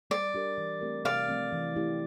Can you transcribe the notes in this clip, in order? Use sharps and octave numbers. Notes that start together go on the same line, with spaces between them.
G3 D5
D4 G4 A#4
E3
A3 C4 G4 A#4
C3 D5 F5
F3 A3 C4
E3
A3 E4 G4